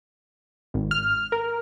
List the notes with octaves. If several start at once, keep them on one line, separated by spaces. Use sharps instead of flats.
G#1
F6
A#4